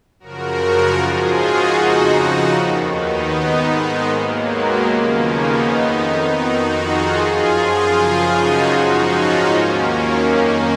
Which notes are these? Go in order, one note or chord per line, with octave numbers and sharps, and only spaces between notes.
F#2 C#3 F3 F#4 A#4
G#2 F3 F4 G#4
D#4 F#4
F2 C#3 F3
D#2 D#3
B3 D#4
G#2 D#3
G#3 B3
D#2 D#3 F#3 A#3
G#3 B3
D#2 C#3 F3 A#3 C#4
B3 D#4
F2 D#3
F2 D#3 D#4 F#4
F4 G#4
F#2 F3 F4 G#4
F4 G#4
F#2 C#3 F3
D#4 F#4
G#2 F3 D#4 F#4
C#4 F4
D#2 D#3 A#3 C#4
F#3 A#3
F2 D#3 A#3 C#4